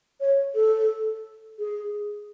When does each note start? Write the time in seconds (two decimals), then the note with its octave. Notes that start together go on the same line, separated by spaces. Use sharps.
0.20 C#5
0.55 A4
1.59 G#4